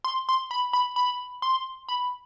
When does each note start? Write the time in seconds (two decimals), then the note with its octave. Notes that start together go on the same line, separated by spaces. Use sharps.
0.04 C6
0.29 C6
0.51 B5
0.73 B5
0.96 B5
1.42 C6
1.88 B5